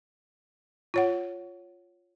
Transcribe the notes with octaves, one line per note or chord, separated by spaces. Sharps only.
F4 C#5 F#5